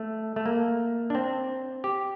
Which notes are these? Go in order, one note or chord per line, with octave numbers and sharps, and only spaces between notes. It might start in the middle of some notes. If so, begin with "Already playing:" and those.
Already playing: A3
A3
A#3
D4
C4
G4